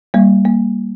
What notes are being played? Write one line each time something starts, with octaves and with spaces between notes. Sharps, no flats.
G3 A#3
A#3